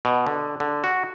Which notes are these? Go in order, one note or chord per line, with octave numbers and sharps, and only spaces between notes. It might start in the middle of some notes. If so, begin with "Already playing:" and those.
B2
D3
D3
F#4